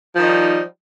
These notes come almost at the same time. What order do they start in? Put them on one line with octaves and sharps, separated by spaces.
F3 D#3 D#4 G3